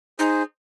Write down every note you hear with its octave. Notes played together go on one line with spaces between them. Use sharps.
D#4 G#4 C5